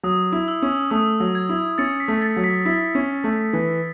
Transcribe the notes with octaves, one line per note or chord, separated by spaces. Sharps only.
F#3 D#6
E4
E6
C#4
A3 D#6
F#3
G#6
E4
C#4 A6 C#7
B6
A3
A6
F#3
B6
E4 B6
C#4
A3
E3